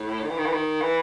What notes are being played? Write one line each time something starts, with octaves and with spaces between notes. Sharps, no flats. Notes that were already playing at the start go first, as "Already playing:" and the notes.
Already playing: A2
D#3
E3
D#3
E3
D#3
E3